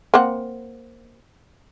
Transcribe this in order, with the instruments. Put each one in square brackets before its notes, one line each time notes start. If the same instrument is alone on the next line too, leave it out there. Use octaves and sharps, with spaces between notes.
[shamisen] A#3 C4 F#5